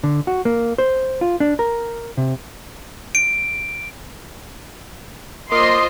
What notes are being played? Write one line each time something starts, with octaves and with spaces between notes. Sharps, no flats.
D3
F#4
A#3
C5
F4
D4
A#4
C3
D7
A#3 F4 A#4 C5 D#5 C6 D6